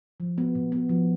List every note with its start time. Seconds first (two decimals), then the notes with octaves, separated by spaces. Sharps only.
0.20 F3
0.38 B3
0.55 A#2
0.72 B3
0.89 F3